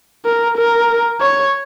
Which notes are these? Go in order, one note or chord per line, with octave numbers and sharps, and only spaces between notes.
A#4
A#4
C#5